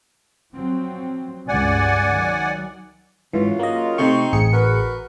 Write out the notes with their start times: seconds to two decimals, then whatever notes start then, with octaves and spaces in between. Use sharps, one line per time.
0.54 F3 F#3 C4
1.48 C#2 G2 D5 F#5 G#5
2.11 D#3 F#3
3.33 G#2 C#3 E3 F#3 F4
3.59 A#3 D#5
3.98 C3 A3 C4 D#4 C#6
4.33 A1 G#4 C#7
4.52 F#4 A#4 B4